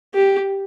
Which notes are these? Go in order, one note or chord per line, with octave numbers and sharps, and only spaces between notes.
G4